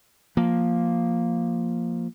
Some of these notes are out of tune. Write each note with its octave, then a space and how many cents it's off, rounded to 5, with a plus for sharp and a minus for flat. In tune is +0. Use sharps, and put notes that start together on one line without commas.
F3 +0 A#3 +0